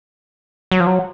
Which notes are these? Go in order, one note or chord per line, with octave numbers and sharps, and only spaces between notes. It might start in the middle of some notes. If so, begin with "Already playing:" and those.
F#3
F3
F#3